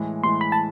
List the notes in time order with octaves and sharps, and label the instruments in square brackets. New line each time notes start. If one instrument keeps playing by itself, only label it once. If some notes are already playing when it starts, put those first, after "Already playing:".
Already playing: [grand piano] A2 E3 G#3
[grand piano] A2 E3 G#3 [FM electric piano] C6
[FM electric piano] B5
A5